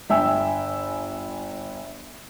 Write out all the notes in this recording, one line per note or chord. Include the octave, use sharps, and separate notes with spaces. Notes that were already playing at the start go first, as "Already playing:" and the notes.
G1 E5 G5 G#5 E6